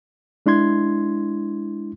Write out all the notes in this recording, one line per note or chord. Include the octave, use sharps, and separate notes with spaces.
G#3 D4 E4 C6 G#6